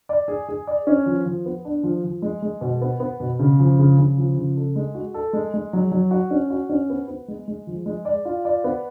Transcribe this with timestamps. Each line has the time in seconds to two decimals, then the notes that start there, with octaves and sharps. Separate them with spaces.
0.09 D5
0.28 G#4
0.49 G#4
0.67 D5
0.87 C#4
1.06 F3
1.26 F3
1.46 B3
1.65 D4
1.83 F3
2.04 F3
2.22 G#3
2.42 G#3
2.61 B2
2.81 B3
3.00 B3
3.20 B2
3.39 C#3
3.59 F3
3.79 C#3
3.98 C#3
4.18 F3
4.36 C#3
4.57 A4
4.76 G#3
4.95 F#4
5.14 A4
5.33 G#3
5.54 G#3
5.73 F#3
5.91 F#3
6.11 F#4
6.31 C#4
6.50 F#4
6.69 C#4
6.90 B3
7.08 B3
7.28 G#3
7.48 G#3
7.67 F3
7.86 G#3
8.05 D5
8.25 F4
8.45 D5
8.64 B3